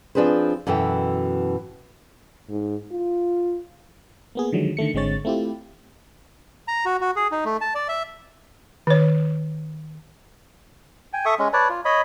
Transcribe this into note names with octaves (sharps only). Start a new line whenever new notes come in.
F3 C4 D4 G#4 B4 C5
F#2 B2 E3 A4 G5
G#2
F4
A#3 B3 G#4
D3 D#3 F3 F#3 G#3
D3 D#3 A3 C#7
G#1 D3 G#3 C4 C#5 A6
A3 C4 E4 F4 G4
A#5
F#4
F#4
G#4
D#4
A3
A5
D5
E5
D#3 C#5
G5 G#5
A4 E5 C#6 D#6
G#3 C#4
B4 C#5 D5 A5
F4
C#5 D#5 B5